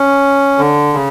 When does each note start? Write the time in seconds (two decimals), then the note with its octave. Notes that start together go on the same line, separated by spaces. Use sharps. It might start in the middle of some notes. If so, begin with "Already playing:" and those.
Already playing: C#4
0.58 D3
0.94 C#3